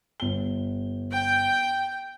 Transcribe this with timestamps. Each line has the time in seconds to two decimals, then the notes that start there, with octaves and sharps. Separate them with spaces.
0.20 G1 G7
1.12 G5